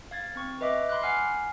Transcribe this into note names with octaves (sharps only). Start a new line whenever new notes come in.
F5 G#6 A6
C4 C#6
B4 D#5 E5 D6
B5 C6 D6 F#6
F#5 G#5 F6 C7